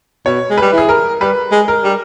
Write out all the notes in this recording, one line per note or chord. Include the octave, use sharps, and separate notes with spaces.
B2 C#5
G#3
G3 B4
E3
G#4
A#4
G3 B4
G#3
A#4
G3